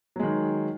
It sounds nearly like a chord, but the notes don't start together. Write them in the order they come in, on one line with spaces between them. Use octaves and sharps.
F#3 G#3 D#3